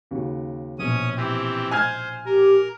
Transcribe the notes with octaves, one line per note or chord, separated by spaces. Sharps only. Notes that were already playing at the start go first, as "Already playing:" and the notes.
D#2 C#3 F#4
A#1 B2 C#4 D#6
E3 C4 G4
C5 G#5 F6 G#6
G4 A#4